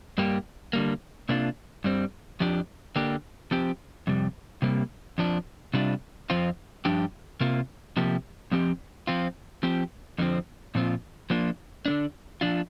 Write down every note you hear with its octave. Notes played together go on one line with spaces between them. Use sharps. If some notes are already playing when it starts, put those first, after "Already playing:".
G2 G3 A#3 G4
D3 G3 A#3
C3 A#3 D4 F4
G2 G3 C4
F2 F3 D4 G4
D3 A#3 D4 G4
F3 C4 G4
F2 C3 G3
C3 G3 A#3
F2 F3 D4
C3 G3 D4 F4
F2 F3 C4 F4
G2 F3 D4 G4
C3 A#3 F4
C3 F3 A#3 G4
F2 F3 C4 G4
F3 C4 F4
F3 C4 G4
F2 D3 F3 C4
A#2 F3 C4 F4
F3 A#3 D4 F4
D3 A#3 D4
F3 D4 F4